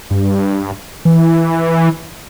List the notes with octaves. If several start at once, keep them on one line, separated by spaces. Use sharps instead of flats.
G2
E3